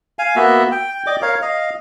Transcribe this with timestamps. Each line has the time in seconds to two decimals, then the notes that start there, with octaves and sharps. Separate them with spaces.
0.19 F5 G#5
0.36 A#3 B3 F#4 E5
0.72 G5
1.07 D5 D#5 G5 D6
1.22 A#4 C#5 F5
1.42 D#5 F5